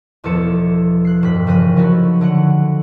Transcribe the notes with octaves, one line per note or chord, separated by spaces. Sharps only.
E1 E2 F3 A4 C#7 E7
F#6 C7
E1 G2 F#6 B6
F1 C#3 F3 A#4 F#6 D#7
F3 F#3 A3 D#4 E4 F#4
D3 F#3 F#5